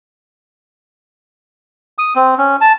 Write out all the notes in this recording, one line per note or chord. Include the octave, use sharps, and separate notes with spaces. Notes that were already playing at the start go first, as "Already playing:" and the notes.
D#6
C4
C#4
A5